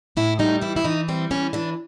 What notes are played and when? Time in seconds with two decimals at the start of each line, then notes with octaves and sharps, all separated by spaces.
0.17 A2 E4
0.39 G3 D#4
0.61 E3 E4
0.76 E4
0.84 E3 D#4
1.08 G3 C4
1.31 E3 C#4
1.53 E3 D4